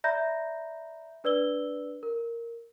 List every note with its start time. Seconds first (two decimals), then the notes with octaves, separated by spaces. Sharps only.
0.04 D5 E5 A#5 B5 G6 A#6
1.24 D4 B4 D5 E6 G7
2.03 A#4